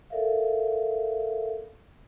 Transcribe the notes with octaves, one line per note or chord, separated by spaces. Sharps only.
A4 A#4 D5 E5 F5